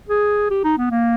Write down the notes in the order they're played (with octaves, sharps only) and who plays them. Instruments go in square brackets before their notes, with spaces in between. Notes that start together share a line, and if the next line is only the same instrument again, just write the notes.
[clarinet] G#4
G4
D#4
B3
A#3